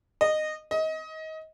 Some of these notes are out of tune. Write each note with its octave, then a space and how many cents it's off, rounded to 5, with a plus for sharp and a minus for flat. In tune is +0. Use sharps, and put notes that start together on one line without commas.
D#5 -15
D#5 +25